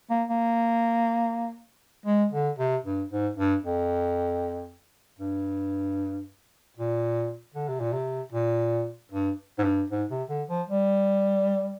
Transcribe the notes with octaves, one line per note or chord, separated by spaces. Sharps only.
A#3
A#3
G#3
D3
C3
G2
G#2
G2
F2
G2
A#2
D3
C3
A#2
C3
A#2
G2
G#2
G2
G#2
C3
D3
F3
G3